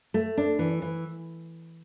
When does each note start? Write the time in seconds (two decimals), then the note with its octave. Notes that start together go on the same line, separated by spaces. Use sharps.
0.14 A3
0.37 D4
0.59 E3
0.82 E3